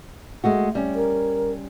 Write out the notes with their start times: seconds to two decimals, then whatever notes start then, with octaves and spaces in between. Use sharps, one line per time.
0.44 G#3 A3 F#4
0.75 G3 C#4
0.95 A#4